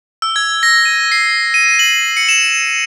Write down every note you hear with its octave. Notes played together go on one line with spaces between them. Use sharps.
E6
G#6
A#6
D#7
C7
D#7
F#7
C#7
E7